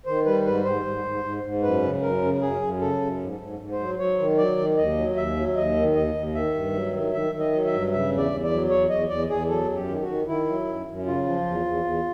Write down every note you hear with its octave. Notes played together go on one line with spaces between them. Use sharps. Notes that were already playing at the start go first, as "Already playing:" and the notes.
D#3 C5
G3 B4
G#2 B4
G#2 C5
G#2
G#2
G#2
G#2
F#2 B4
C#3
F#2 A#4
C#3
F#2 G#4
F#2
C#3 A4
F#2
G#2
G#2
G#2
C5
F#3
F#3 C#5
D#3
F#3 D5
D#3
D#2 D#5
F#3
D#2 E5
F#3
D#2 D#5
D#3
D#2 D#5
D#2
D#3 E5
G2
F#3
D#3
D#3 E5
D#3
D#5
F#3
E5
G2
C#3 E5
E2
D5
E2
D5
F#3
E2 C#5
E2 D#5
E2 D5
E2 G#4
F#3 A4
F#2
G4
D#3
F#4
D#3
D#3 E4
F#3
F#2
F#2
C#3 F4
F3
E2
E2
E2